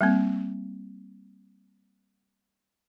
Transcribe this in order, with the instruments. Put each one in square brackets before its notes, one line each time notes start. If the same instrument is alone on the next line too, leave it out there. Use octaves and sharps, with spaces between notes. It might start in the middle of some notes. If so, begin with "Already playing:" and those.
[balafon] G3 A#3 C4